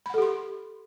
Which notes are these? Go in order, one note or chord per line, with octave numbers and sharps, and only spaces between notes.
G4 A4 F#5 B5 C6